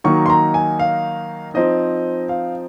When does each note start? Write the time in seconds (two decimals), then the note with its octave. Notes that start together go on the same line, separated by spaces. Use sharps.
0.04 D#3 F#3 A#3 D#4 C#6
0.26 C6
0.30 A#5
0.54 G#5
0.79 F5
1.54 F3 C4 D#4 D#5
2.29 F5